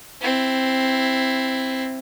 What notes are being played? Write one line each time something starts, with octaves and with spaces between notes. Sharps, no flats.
C4 E4